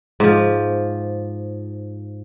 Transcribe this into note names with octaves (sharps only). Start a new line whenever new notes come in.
G#2 F3